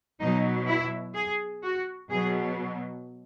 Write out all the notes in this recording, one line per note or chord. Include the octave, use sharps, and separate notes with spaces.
B2 F#3 D#4
E4
G#4
F#4
B2 F#3 G#4